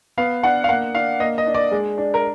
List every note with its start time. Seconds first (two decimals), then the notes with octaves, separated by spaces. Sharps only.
0.18 B3 F5
0.43 D4 F#5
0.64 F5
0.69 A#3 F#5
0.94 D4 F5
1.20 A#3 D#5
1.38 D#5
1.47 D4
1.54 D5
1.71 G#3
1.98 D4
2.14 A#4